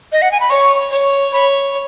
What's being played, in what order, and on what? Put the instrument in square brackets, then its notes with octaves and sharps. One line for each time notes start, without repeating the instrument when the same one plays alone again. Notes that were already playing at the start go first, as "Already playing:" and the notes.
[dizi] D#5
F#5
G#5
B5
[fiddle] C#5 [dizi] C#6
[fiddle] C#5
[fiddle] C#5 [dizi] B5